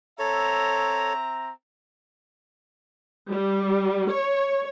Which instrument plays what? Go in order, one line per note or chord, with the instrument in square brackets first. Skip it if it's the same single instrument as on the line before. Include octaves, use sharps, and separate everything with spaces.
[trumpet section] C4 E5 A#5 [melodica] A4 C#5
[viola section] G3
C#5